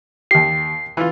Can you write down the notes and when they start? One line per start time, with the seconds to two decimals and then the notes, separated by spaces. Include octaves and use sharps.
0.31 D#2 G4 C7
0.97 E3 F4